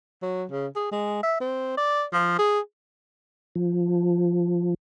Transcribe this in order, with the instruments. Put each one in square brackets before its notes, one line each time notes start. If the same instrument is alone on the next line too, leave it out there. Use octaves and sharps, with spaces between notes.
[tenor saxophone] F#3
C#3
G#4
G#3
E5
C4
D5
F3
G#4
[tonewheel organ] F3